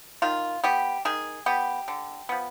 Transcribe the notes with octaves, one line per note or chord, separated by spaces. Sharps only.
D#3 F4
B3 G4
D#3 G#4
B3 G4
D3
F3 B3